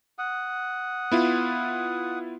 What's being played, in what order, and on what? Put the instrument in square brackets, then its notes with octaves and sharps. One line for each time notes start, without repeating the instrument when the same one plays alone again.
[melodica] F#5 D#6
[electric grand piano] B3 E4 F4